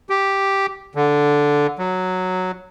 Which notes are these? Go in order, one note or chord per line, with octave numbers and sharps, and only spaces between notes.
G4
D3
F#3